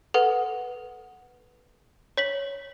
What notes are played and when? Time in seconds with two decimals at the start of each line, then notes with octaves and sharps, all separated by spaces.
0.14 A4 B4 F#5
2.17 C#5 B6 F#7